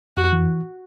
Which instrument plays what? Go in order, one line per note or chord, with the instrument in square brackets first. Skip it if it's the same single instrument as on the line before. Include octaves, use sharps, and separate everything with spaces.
[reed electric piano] F2 [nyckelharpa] F#4
[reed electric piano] E3